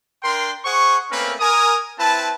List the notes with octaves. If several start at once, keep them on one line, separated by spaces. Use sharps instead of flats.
D4 A#4 G5 C6
G#4 C5 F#5 C#6
A3 A#3 C4 C#4 A#4 B4
A#4 G#5 D#6
C4 E4 B4 A5